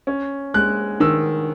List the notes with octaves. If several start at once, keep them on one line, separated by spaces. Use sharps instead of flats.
C#4
G#3 F#6
D#3 E6